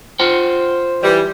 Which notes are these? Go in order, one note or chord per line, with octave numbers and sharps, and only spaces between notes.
F4 C5 F#5 G5
E3 G3